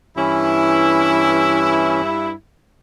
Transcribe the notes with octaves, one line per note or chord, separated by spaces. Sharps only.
G2 E3 C#4 E4